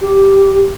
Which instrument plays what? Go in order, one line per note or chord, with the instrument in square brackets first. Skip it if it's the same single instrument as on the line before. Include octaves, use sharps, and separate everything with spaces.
[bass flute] G4